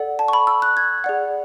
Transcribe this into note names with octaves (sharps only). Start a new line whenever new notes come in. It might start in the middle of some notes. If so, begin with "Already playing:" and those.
Already playing: A4 D5 F#5
A5
C#6
B5
E6
F#6
G#6
G#4 D5 F#5